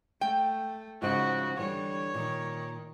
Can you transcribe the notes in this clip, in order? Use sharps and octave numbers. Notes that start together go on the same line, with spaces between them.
A3 G5
G#2 C#3 F3 F#4
D3 E3 G3 C#5
A#2 D#3